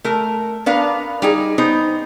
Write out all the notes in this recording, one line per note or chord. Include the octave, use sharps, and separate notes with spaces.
A3 A#4
B3 D4 A#4 B4 F5
G3 D#4 G#4
B3 D#4 C5